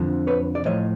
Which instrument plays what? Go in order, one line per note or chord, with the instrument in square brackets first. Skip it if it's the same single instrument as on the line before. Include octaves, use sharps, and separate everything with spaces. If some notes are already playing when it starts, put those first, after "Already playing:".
Already playing: [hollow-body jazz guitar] F2 D3 F3
B4 C#5
D5
A2 F3 C#5 D#5